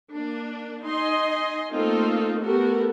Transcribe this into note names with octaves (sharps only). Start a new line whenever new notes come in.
A#3 D4
D#4 D#5 G#5 C6
A3 A#3 C4 D#4 F4 A4
A3 B3 F#4 G4 A4 A#4